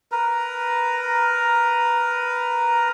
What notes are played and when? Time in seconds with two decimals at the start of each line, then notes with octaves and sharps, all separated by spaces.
0.12 A#4 B4 A#5